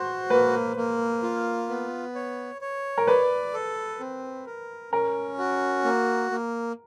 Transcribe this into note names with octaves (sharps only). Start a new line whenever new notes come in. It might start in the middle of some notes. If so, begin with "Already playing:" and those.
Already playing: F#4 C5
A#3 B4
A#3
F4
B3
C#5
C#5
A#4
B4 D5
A4
C4
A#4
C#4 A#4
F#4
A#3
A#3